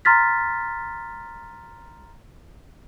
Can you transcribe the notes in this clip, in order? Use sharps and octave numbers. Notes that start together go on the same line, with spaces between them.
A#5 C6 F6 A6 B6